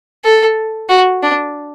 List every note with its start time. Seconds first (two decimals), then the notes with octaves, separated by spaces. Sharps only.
0.24 A4
0.90 F#4
1.23 D4